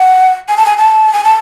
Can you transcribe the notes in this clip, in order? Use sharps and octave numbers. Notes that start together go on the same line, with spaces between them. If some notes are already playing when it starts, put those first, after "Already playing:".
Already playing: F#5
G#5
A5
G#5
A5
G#5
A5